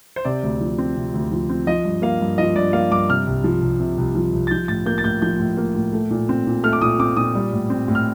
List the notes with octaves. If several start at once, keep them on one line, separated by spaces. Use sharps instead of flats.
C5
C3 D5
D2
F3
C4
C3
D2
F3
C4
F3 D#5
G2
A#3 F5
G2
F3 D#5
G2 D5
A#3 F5
G2 D6
C3 F6
C2
F3
C2
C3
C2
F3
C2
A6
F3 G6
A2 A6
A#3 G6
A6
A2 G6
F3 G6
A2
A#3
A2
A3
A#2
C4
A#2
A3 F6
D6
A#2 D#6
C4 D6
A#2 D#6
G3
A2
C4
A2
F6